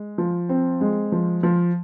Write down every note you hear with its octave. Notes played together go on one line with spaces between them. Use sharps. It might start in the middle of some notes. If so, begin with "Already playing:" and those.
Already playing: G#3
F3
C4
G#3
F3
F3